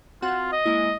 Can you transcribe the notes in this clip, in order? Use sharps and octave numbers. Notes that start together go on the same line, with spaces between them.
C4 F4 F#4 F#5
D#5
G#3 A#3 E4